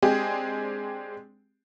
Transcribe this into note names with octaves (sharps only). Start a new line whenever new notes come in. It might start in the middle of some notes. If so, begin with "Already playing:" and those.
G#3 C4 D4 G4 G#4